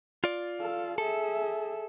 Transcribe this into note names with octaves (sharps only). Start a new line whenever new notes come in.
F4 D5
A4 F5
G#4 A4 E5